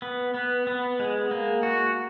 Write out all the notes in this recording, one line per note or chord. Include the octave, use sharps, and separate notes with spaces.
B3
B3
B3
G#3
A#3
F#4